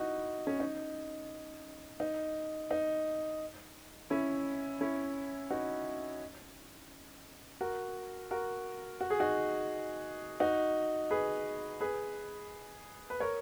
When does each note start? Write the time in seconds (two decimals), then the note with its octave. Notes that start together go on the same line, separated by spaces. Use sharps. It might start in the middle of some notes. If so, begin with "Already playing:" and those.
Already playing: D#4 E4 F#4
0.47 C#4
0.60 D#4
2.00 D#4
2.71 D#4
4.10 C#4 E4
4.81 C#4 E4
5.50 D#4 F#4
7.61 F#4 A#4
8.31 F#4 A#4
9.01 F#4
9.10 G#4
9.20 D#4 F#4
10.40 D#4 F#4
11.11 G#4 B4
11.81 G#4 B4
13.10 B4
13.20 A#4 C#5